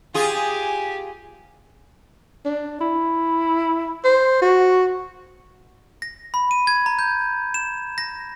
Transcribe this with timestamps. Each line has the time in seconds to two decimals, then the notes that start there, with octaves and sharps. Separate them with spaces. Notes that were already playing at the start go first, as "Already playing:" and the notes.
0.14 F4 G4 G#4 G#5
2.45 D4
2.80 E4
4.04 C5
4.42 F#4
6.02 A#6
6.34 B5
6.51 D#7
6.67 G#6
6.86 A#5
6.99 G6
7.54 E7
7.98 A#6